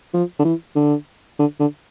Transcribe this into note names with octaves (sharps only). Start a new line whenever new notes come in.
F3
D3
E3
D3
D3
D3